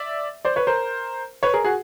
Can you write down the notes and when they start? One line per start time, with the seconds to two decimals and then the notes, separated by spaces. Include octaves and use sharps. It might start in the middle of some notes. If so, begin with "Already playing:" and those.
Already playing: D5 E5
0.45 C5 D5
0.56 B4 C#5
0.67 A#4 C5
1.43 B4 C#5
1.54 G#4 A#4
1.64 F#4 G#4